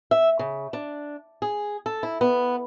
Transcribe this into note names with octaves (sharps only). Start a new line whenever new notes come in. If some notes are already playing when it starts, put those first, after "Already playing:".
E5
C#3
D4
G#4
A4
E4
B3